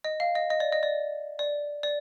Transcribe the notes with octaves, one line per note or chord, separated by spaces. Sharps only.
D#5
F5
D#5
D#5
D5
D#5
D5
D5
D5